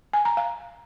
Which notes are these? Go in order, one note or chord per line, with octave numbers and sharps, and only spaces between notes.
G#5
A#5
F5